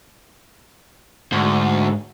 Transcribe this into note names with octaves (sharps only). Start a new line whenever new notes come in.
D2 G#2